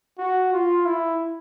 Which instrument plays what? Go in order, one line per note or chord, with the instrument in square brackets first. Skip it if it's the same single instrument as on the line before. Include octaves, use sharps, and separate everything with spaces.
[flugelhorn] F#4
F4
E4